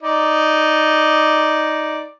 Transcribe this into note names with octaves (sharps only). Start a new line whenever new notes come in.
D#4 D5